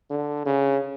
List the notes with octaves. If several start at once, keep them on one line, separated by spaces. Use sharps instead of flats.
D3
C#3